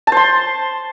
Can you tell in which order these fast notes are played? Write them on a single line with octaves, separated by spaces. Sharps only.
A5 C5 C6